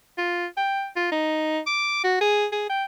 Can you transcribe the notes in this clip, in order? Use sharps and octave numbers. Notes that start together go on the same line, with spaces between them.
F4
G5
F4
D#4
D6
F#4
G#4
G#4
G5